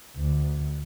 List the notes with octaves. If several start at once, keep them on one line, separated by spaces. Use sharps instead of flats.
D2